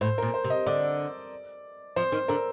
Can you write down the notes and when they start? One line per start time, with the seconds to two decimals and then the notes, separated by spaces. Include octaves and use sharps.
0.01 A2 C5
0.18 A#2 A#4
0.34 C5
0.44 C3
0.50 D#5
0.66 D3 D5
1.96 F3 C5
2.12 D#3
2.28 D3 A#4